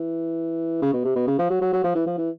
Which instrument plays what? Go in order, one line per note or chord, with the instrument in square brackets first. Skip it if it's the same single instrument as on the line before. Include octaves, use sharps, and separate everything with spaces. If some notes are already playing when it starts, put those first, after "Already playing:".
Already playing: [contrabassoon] E3
C#3
B2
C3
B2
C#3
F3
F#3
F#3
F#3
F3
E3
F3
E3